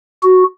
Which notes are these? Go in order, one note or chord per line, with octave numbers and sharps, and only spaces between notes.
F#4